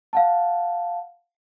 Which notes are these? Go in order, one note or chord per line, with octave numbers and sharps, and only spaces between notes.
F5 F#5 A5